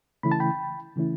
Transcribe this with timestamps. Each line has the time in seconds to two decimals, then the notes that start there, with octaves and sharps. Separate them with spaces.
0.23 C#3 E3 A3 C#4 E4 B5
0.32 A5
0.40 G5 B5
0.96 C#3 E3 A3 C#4 E4